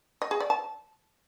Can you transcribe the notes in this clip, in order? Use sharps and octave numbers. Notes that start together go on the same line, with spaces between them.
D#5
G#4
D5
A5